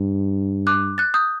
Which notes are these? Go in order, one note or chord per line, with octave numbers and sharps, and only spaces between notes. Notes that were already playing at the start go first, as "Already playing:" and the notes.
Already playing: G2
D6 F#6
F#6 A6
D#6 G6